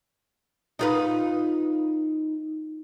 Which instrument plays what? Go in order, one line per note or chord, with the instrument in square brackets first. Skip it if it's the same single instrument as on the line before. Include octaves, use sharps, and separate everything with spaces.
[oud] D#4 F4 B4